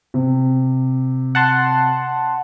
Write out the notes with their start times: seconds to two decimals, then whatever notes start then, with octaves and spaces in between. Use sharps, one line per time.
0.14 C3
1.35 F#5 A5 C6